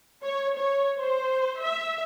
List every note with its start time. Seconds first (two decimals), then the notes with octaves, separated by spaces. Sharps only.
0.23 C#5
0.57 C#5
0.98 C5
1.63 E5